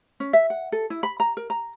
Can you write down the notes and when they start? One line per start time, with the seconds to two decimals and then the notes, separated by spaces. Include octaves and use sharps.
0.20 C#4
0.33 E5
0.50 F#5
0.72 A4
0.90 E4
1.03 B5
1.20 A#5
1.37 A#4
1.50 A#5